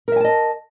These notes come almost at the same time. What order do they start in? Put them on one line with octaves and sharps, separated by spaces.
A#4 E5 G#5 A5 D#5